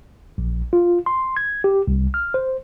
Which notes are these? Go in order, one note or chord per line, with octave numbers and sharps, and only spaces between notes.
A#1
F4
C6
G#6
G4
C2
F6
C5